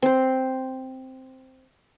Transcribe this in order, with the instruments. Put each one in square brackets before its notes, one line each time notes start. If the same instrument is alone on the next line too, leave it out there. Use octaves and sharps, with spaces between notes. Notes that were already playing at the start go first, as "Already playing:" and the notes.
[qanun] C4 C5